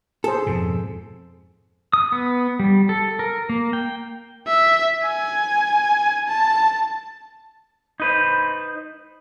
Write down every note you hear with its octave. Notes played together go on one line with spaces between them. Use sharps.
G#4 A4 C5
F2 G#2 B2
D#6
B3
G3
A4
A#4
A#3
G5
E5
G#5
A5
D#4 B4 C5